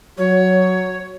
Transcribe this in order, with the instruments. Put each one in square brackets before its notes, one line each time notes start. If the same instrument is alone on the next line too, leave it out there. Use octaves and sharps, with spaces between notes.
[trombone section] F#3 [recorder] C#5